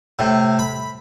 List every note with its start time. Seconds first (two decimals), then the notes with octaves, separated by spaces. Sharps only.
0.19 A2 C3
0.59 B5